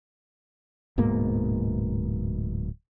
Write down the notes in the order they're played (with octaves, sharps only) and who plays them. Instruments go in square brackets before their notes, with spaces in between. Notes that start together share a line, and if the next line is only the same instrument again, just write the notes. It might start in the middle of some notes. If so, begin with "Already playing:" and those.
[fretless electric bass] D1 G#2 B2 A#3